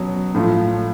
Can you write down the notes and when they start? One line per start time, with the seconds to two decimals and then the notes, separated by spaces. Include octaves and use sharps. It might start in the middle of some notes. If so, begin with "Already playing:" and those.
Already playing: B2 F#3 C#4
0.34 A2 F3 A3 F4